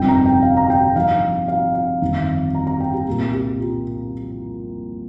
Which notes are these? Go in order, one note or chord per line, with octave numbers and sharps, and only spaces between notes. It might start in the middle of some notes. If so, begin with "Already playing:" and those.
Already playing: G1 F2 C3 G3 D#4 G5
A#5
G5
F5
A#5
G5
G2 F3 D#4 F5
F5
F5
G1 F2 D#3 C4 D#4
A#5
A#5
G5
G4
C2 A#2 A#3 G4
G4
F4